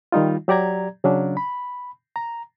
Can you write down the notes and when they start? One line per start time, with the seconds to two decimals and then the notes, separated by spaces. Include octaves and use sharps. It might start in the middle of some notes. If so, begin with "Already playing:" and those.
0.12 D#3 G3 D#4 F4
0.48 F#3 G4 D5 A#5 G#6
1.04 C#3 F#3 C#4 D4
1.37 B5
2.16 A#5